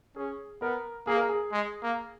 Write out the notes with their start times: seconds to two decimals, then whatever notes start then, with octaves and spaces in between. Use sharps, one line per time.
0.16 C#4 G#4
0.61 B3 A#4
1.07 A#3 G#4
1.17 A#4
1.29 G#4
1.52 G#3
1.83 A#3